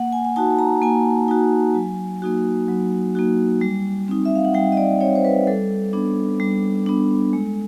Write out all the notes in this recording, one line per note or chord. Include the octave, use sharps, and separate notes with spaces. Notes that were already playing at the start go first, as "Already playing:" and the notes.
Already playing: A#3 F#5
G#5
G#5
D#4 F#4 A5
A#5
A#3 G#5
D#4 F#4
F#3
A#3 D#4 F#4
F#3
A#3 D#4 F#4
G3
C4 D#4
E5
F5
F#5
G3 G5
D#5
D5
C4 D#4 C#5
C5
B4
G3 A4
B3 D4
G3
B3 D4
G#3